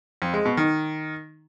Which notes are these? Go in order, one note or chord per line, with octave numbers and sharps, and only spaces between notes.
F2
G#3
B2
D#3